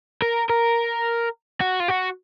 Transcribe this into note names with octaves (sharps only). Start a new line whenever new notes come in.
A#4
A#4
F#4
F4
F#4